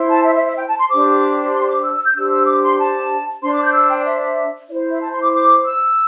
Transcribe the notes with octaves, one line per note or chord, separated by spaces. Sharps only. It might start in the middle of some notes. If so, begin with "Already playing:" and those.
Already playing: E4 C5
A5
E5
E5
E5
G5
A5
C6
D4 G4 C5 D6
C6
D6
E6
E6
G6
D4 G4 C5 E6
E6
D6
C6
A5
D4 C5 C6
D6
G6
E6
G5
E5
E4 C5 D5
E5
A5
C6
D6
D6
E6